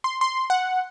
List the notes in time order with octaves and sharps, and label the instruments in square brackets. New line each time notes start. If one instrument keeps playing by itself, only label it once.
[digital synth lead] C6
C6
F#5